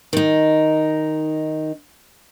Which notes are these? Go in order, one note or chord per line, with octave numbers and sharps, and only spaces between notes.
D#3 D#4